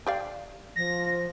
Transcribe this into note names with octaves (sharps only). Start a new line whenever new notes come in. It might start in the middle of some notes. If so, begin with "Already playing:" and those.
G4 D5 F5
F3 A#6